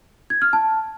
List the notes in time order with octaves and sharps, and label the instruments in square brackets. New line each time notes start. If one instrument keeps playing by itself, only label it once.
[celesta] G#6
F6
A5